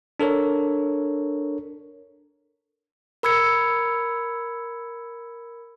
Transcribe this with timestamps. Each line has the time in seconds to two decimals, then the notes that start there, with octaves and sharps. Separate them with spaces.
0.20 D4 A4 A#4 C#5
3.23 A#4 B5 E6 G#6 C#7